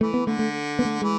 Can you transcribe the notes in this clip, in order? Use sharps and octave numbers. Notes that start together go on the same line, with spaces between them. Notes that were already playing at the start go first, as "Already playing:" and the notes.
E3 A3
B3
D3 A3
A3
B3
A3
E3 G#3